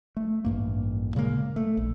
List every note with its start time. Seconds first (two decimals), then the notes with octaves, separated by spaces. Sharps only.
0.17 A3
0.45 A1 G2 A#3
1.15 A#2 C#3 G#3 A#3
1.56 A3
1.77 A#1